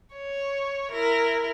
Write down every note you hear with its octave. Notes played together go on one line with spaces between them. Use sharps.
C#5
E4 A#4